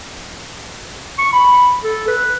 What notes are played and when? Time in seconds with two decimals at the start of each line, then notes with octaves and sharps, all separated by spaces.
1.18 C#6
1.32 B5
1.84 A4
2.08 B4